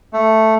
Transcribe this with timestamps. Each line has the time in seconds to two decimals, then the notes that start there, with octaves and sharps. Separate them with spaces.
0.13 A3